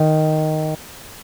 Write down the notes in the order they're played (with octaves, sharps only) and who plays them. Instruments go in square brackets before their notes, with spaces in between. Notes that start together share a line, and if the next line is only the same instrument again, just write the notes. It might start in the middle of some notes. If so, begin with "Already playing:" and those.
Already playing: [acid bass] D#3